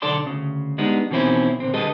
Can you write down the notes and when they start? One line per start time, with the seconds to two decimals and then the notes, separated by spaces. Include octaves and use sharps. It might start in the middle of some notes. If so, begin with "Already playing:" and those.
0.02 B1 D3 A4 D5 A5 C6
0.24 D2 C#3
0.78 G3 G#3 B3 D4 D#4
1.11 B2 D#3 E3 C4 C#4 E4
1.60 A#2 D3 C4
1.74 D3 G3 G#4 A4 B4 D#5